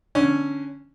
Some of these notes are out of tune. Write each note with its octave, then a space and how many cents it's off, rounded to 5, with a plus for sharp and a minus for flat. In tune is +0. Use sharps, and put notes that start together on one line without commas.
D3 +10 C#4 +0